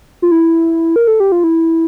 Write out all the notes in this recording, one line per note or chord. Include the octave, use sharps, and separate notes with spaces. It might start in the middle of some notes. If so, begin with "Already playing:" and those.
F4
E4
A#4
A4
G4
F4
E4